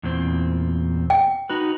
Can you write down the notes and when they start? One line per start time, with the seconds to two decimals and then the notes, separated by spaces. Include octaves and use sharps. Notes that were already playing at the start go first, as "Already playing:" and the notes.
0.03 E2 A#2 C4
1.10 G5
1.49 D#4 F#4 B4